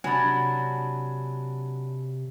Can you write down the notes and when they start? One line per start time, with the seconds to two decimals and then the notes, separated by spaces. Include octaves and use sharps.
0.04 C3 F#3 D4 G#5 B5 A6